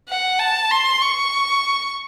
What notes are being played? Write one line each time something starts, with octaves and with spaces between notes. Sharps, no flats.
F#5
A5
C6
C#6